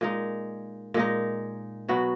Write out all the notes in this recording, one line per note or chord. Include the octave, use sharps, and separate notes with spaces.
A#2 G#3 D#4
A#2 G#3 D#4
B2 F#3 B3 F#4